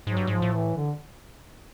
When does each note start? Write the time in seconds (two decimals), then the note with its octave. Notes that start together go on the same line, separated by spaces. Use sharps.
0.07 G#2 F#3
0.17 G2
0.27 G#2 F3
0.42 A2
0.53 E3
0.77 D3